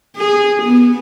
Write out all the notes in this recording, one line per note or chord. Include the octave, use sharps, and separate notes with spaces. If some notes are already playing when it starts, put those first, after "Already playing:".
G#4
B3